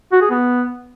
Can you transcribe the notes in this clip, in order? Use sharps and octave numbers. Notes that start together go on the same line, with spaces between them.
F#4
G#4
B3